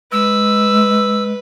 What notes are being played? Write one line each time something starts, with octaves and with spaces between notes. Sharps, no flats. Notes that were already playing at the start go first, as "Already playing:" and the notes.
G#3 B4 E6